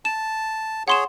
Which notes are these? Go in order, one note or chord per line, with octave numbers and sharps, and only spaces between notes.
A5 E7
G#4 C#5 F#5 C6 E7